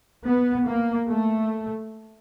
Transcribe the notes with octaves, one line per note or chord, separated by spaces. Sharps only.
B3
A#3
A3